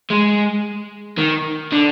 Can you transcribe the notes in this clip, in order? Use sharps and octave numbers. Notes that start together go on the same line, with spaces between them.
G#3
D#3
D3